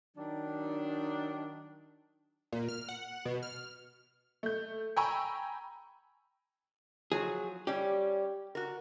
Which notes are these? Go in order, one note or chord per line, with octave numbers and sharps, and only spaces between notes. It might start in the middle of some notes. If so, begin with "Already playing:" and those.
D#3 F#3 D4
A#2
F6
F#5
B2
F6
A3 G6
G5 G#5 A#5 B5 C#6 E6
F3 F#3 G#4
G3 C#4 G4
F#4 A#4